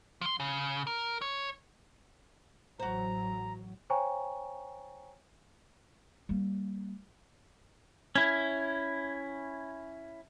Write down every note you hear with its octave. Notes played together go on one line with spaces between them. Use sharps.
F3 C6
C#3
A#4
C#5
A1 F#3 F#4 C5 A#5
C5 C#5 G5 G#5 A#5 C#6
G3 A#3
C#4 E4